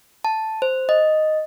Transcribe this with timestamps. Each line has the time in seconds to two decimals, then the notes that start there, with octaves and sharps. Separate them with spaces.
0.25 A5
0.62 C5
0.89 D#5